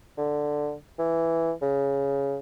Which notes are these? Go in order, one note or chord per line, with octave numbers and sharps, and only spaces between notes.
D3
E3
C#3